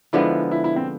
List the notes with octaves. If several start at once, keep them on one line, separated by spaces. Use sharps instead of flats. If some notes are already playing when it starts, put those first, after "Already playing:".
D3 F3 G#3 B3 E4
E4
E4
C4